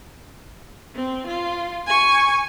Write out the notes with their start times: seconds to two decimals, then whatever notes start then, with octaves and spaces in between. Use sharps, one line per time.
0.95 C4
1.27 F4
1.86 G#5 C#6